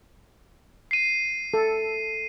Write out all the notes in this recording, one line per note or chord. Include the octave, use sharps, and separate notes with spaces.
C7 D#7
A4